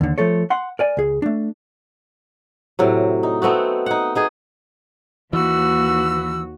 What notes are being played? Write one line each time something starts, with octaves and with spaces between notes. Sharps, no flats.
D#2 D3
F3 A3 A4 C#5
F#5 C6
A#4 D5 G#5
C#2 G#4
A3 D4
A2 C3 F#3
D#4
A3 B3 C4 F#4
D#4 F#5
B3 D#4 G#4
D#2 E3 F#4 B4 B5 E6